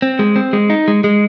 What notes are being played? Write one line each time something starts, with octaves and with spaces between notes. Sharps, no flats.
C4
G#3
C4
G#3
D#4
G#3
G#3